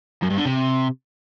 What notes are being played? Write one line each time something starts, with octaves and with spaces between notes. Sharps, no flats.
F#2
G2
D3
C3